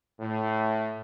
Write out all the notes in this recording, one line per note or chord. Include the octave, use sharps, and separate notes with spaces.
A2